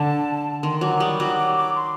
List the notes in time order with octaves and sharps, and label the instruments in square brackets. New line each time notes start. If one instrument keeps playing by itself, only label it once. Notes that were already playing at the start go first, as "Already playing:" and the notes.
Already playing: [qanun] D3 [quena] A5
[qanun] D#3 [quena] C6
[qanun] F#3 [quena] D6
[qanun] G3 [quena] D#6
[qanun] F#3 [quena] D6
[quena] D6
D6
C6